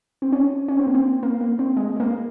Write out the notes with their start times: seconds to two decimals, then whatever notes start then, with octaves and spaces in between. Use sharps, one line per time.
0.22 C4
0.32 C#4
0.68 C#4
0.77 C4
0.87 A#3
0.95 C4
1.23 A#3
1.41 A#3
1.59 C4
1.77 G#3
1.96 G#3
2.00 A#3